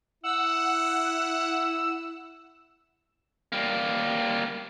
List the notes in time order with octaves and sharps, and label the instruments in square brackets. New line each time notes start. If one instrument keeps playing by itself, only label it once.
[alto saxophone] E4 [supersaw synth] F#5 [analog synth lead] E6
[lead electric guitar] G3 A#3